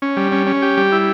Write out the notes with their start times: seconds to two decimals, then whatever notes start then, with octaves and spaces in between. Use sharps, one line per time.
0.02 C#4
0.17 G3
0.32 C#4
0.47 C#4
0.62 G4
0.77 G3
0.92 E4